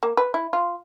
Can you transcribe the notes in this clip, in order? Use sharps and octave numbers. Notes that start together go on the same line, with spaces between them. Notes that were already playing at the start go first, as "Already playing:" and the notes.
A#3
B4
E4
F4